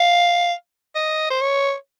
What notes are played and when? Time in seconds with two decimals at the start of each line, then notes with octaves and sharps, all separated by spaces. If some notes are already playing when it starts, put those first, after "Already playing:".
Already playing: F5
0.95 D#5
1.31 C5
1.41 C#5